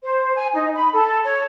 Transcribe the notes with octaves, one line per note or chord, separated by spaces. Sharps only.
C5
G#5
D#4
B5
A4
C#5